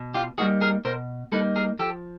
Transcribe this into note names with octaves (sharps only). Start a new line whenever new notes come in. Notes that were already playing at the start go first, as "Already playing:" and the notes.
Already playing: B2
F4 G4
G3 A#3 D#4 F#4 G#4
G#4 A#4
B2 A#4 C5
G3 A#3 D#4 A4 B4
G#4 A#4
F3 G4 A4